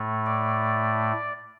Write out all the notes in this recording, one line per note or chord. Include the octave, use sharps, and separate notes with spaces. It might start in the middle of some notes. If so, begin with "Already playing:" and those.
Already playing: A2 A3
D5